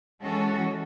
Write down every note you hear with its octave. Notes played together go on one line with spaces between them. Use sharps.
E3 G#3 C#4 F#4 A4